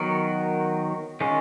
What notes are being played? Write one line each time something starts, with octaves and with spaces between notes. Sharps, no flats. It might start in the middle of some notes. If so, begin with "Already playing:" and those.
Already playing: D#3 F#3 B3 F#4 A#4
D#3 G#3 C#4 F4